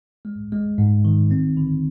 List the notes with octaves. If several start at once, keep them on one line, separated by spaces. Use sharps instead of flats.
G#3
G#3
G#2
D#3
C4
D3